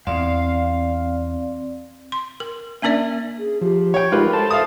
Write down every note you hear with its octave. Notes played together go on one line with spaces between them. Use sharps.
E2 C4 D5 F5
C6
A#4
A#3 C#4 D4 A#4 D5 E5
G#4
F3 G4
C#5 G5
G#3 D#4 F4 G4 A#4 B4
A4 C5 A5
E5 F5 D#6